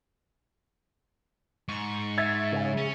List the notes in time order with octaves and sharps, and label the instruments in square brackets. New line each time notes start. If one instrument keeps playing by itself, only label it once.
[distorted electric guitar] G#2 [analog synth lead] C#6
[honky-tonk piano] E5 G#6 A6
[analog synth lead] C#3
[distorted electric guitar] C#4